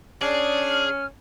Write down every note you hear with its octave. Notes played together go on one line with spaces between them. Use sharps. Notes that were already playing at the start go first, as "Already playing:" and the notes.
C#4 D4 G#4 D5
F6